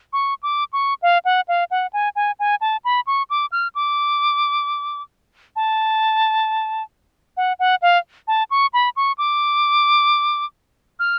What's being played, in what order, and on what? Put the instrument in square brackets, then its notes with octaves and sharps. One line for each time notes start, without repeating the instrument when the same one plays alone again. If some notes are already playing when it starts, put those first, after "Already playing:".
[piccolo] C#6
D6
C#6
F5
F#5
F5
F#5
G#5
G#5
G#5
A5
B5
C#6
D6
F6
D6
A5
F#5
F#5
F5
A5
C#6
B5
C#6
D6
F6